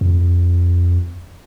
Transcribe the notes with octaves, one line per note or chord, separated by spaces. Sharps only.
F2